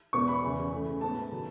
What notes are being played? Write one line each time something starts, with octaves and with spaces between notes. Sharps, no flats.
E2 B2 G#3 B3 C#6
B5
E2 C#3 E3
C#3 E3 A3
A2 G#3 B3 A5
D#3 F#3